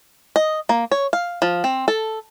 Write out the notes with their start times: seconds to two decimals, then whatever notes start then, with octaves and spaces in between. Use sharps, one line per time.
0.36 D#5
0.69 A#3
0.91 C#5
1.13 F5
1.42 F3
1.64 C4
1.88 A4